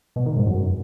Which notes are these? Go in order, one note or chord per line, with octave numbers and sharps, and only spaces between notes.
B2
D#3
G#2
F#2